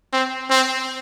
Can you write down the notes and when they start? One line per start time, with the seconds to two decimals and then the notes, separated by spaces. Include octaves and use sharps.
0.12 C4
0.50 C4